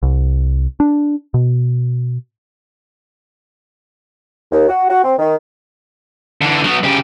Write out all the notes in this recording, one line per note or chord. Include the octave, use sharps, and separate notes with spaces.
C2
D4
B2
D#2
F#4
F#4
C4
D#3
D3 E3
F#3 B3
C#3 G4